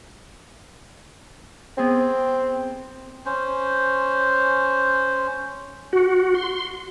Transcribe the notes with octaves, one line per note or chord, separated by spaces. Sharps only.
B3 C4 G#4
C#4 C5
F#4
C6